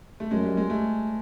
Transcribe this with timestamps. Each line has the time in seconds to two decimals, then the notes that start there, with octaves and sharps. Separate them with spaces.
0.20 A3
0.31 F#2 G#3
0.44 G3
0.57 G#3
0.70 A3